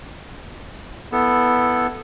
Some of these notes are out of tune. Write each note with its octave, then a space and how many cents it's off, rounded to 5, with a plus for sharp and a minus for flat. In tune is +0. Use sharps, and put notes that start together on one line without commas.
B3 +0 E4 -5 A4 +0